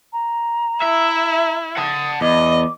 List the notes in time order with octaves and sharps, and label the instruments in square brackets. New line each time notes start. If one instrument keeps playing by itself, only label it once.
[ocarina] A#5
[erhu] E4 [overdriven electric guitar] E5
[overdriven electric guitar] F#5 A5 [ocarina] D#6
[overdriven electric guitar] E2 [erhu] D#5 [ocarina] D6